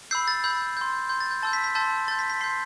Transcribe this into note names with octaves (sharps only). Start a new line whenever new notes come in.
B5 E6 G6 C7
A6
B5 E6 G6
C6 G6
C6 G6
A6
G6
A5 C6 E6 G6 A6
B6
B6
A5 C6 E6 G6 A6
C6 G6 A6
B6
B6
C6 G6 C7